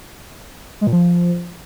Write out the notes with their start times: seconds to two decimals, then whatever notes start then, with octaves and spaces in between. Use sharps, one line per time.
0.81 G#3
0.87 A#2
0.93 F3